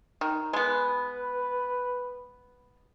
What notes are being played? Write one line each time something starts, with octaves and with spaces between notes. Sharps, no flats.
D#3
G#3 B3 B4